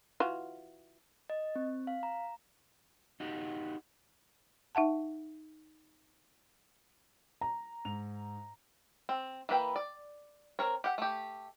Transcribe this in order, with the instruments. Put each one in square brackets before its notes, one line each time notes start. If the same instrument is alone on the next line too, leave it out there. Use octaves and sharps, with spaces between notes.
[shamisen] E3 F4 F#4
[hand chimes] D#5
C4
F5
A#5
[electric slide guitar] D#4 F#4 G4
[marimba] D#4 E5 F#5 A5
[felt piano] A#5
[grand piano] G#2 F7
[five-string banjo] C4
E3 A#3 B4 G5
D5
C4 A#4 C#5
G4 F#5
A3 G4